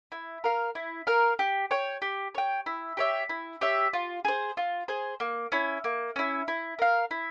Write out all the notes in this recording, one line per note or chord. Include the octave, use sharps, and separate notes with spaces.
E4
A#4 F5
E4
A#4 F5
G4
C#5 G5
G4
C#5 G5
E4
G4 C#5 E5
E4
G4 C#5 E5
F4
G#4 C5
F4
G#4 C5
A#3
C#4 E4
A#3
C#4 E4
E4
A#4 F5
E4